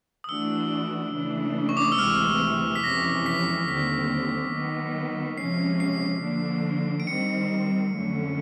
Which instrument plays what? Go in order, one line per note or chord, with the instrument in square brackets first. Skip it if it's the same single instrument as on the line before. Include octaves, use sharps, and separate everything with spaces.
[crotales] D#6
[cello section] E3 A3 D4 F#4 [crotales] E6
[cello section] C#3 E3 A3 D4
[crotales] C#6
D6
D#6
E6
[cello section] D2 C3 E3 G#3 C4 [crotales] F6
[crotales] B6
[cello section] F2 C3 E3 G#3 C#4 [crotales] A#6
[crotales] B6
[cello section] D#2 D3 G3 C4 [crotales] B6
[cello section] D#3 F#3 B3
[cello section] C3 F3 G#3 C#4 [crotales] C7
[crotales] C7
[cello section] D3 F3 A#3 D4
[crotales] D7
[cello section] D#3 G3 C4 [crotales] C#7
[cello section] F2 D3 F#3 A3 C#4